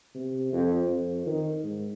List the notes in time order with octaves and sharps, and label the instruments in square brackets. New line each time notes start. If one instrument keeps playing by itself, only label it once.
[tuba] C3
F2
F2
D#3
G#2